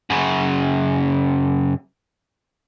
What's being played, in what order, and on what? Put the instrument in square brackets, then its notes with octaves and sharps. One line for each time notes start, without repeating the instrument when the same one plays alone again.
[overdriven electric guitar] F#2 C#3